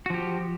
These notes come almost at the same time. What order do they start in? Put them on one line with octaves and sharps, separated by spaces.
F#4 F3 G4